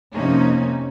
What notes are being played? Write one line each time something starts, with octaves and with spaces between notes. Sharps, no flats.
F2 C3 A#3 C#4 D#4